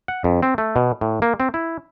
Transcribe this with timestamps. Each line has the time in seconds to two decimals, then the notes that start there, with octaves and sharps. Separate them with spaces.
0.08 F#5
0.24 F2
0.43 C4
0.58 A3
0.76 B2
1.01 A2
1.22 A#3
1.40 C4
1.54 E4